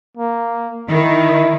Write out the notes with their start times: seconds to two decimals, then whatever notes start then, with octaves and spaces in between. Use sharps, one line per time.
0.17 A#3
0.90 D#3 E4